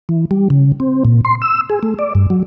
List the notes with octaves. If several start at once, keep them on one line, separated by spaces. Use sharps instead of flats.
E3
G3
C#3
C4
A#2
C6
E6
G#4
A3
D5
G2
F#3